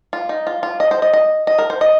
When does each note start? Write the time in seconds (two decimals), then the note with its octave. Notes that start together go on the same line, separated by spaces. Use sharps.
0.13 F4
0.29 D#4
0.47 F4
0.63 F4
0.80 D#5
0.91 C5
1.02 D#5
1.13 D#5
1.47 D#5
1.58 A#4
1.70 C5
1.81 D#5